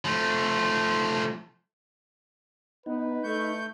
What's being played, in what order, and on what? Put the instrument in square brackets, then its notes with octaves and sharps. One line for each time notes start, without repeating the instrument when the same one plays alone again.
[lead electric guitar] F3 A3
[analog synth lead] B3 [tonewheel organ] D#4 [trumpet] B4
[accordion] A3 G6 [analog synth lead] C#6